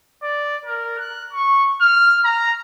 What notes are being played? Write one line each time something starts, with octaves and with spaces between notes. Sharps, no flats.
D5
A#4
F#6
C#6
F6
A#5